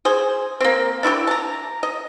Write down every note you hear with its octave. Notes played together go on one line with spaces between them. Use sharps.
G#4 C5
A#3 C4
D4 E4 F#4 G4
A5 A#5
D#5